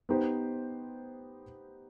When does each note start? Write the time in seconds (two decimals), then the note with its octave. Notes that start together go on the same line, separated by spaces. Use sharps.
0.09 B3 D#4 G4 C5